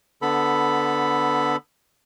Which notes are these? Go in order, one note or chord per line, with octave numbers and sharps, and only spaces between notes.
D3 B3 A4 B5